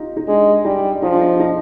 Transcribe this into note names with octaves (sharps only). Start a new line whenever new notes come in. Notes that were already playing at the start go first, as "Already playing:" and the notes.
Already playing: D#4 F4 G4
D#4
G#3 D4
G3 D#4
F3 D#4
D4
D#4
D#4